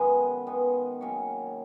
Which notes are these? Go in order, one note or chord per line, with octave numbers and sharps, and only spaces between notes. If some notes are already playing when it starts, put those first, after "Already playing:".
Already playing: F#2 D#3 G#3 B3 B4
D#3 G#3 B3
D#3 F#3 A#3 C#4 C#5